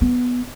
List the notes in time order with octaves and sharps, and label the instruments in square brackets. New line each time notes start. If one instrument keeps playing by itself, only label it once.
[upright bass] B3